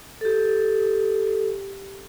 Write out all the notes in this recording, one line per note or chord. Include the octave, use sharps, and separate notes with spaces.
G4 A4